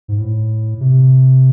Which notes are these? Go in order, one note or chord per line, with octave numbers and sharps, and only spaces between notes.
G#2
A2
C3